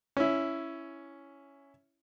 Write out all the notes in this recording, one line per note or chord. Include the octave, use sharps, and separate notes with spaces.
C#4 E4